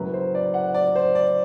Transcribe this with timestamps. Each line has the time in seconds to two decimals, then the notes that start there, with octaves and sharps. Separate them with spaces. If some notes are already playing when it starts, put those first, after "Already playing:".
Already playing: F#1 F#2 F#3 B4
0.13 C5
0.35 D5
0.54 F#5
0.74 D5
0.95 C5
1.15 D5